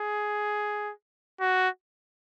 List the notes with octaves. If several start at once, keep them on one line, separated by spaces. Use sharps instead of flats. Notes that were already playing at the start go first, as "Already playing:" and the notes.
Already playing: G#4
F#4